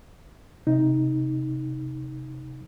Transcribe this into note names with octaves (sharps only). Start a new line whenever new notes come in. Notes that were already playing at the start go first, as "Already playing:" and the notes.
C3 D#4